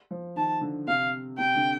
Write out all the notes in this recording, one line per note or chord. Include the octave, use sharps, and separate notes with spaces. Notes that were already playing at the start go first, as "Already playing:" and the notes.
F3
D#3 A5
D3
C3 F5
C3 G5
D3